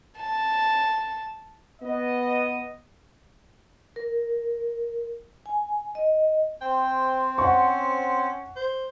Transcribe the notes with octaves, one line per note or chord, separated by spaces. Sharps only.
A5
B3 D#5
A#4
G#5
D#5
C4 C5 G5
C#4 F#5 C#6
C5